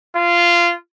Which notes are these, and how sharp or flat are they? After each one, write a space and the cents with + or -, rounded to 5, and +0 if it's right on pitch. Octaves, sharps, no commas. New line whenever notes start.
F4 -15